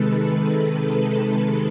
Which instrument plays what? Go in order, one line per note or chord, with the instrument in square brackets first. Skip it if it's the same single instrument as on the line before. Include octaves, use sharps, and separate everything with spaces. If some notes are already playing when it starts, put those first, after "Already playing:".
Already playing: [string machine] C3 D#3 G#3 A4 B4